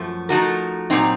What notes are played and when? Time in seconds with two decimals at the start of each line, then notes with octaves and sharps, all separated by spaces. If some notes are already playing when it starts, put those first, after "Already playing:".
Already playing: F#2 F3 A3
0.29 F3 A3 D#4 F#4 A#4
0.90 A#2 F#3 C4 D#4